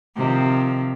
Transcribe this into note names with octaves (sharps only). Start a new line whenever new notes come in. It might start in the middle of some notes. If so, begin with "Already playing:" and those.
C3 D#3 F3